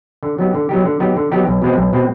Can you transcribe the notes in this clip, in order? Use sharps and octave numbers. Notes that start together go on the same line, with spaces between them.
D3
F#3 B3 D#4 G4
D3
F#3 B3 D#4 G4
D3
F#3 B3 D#4 G4
D3
F#3 B3 D#4 G4
B1
B2 G#3 C4
B1
B2 G#3 C4